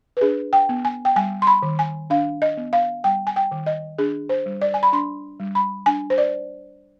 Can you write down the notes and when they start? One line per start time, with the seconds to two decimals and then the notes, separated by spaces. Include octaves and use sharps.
0.17 B4
0.21 D4 G#4
0.53 G5
0.69 B3
0.85 G#5
1.05 G5
1.16 G3 G#5
1.42 C6
1.47 B5
1.63 D#3
1.79 G#5
2.10 D4 F5
2.42 D#5
2.57 B3
2.73 F5
3.04 G3 G5
3.27 G#5
3.36 G5
3.51 D#3
3.66 D#5
3.98 D4 G#4
4.29 C5
4.46 G3
4.61 D5
4.74 G#5
4.83 B5
4.93 D4 C6
5.40 G3
5.55 B5
5.86 D4 G#5
6.10 C5
6.18 D5